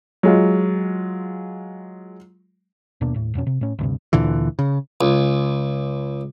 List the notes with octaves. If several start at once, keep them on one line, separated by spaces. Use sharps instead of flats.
F#3 G#3 F4
D#2 B2 A#3 D4
D#2 A2
E1 F2 B2 C#4
C3
A2 C#4
D2 G2 C3
D2 A#2 D3 E3
C#3
C#2